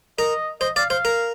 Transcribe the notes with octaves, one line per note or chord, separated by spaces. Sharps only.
A#4 D#5
C5 D#5
D5 F5
C5 F5
A#4